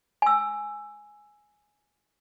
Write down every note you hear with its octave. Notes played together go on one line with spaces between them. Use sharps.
G#5 E6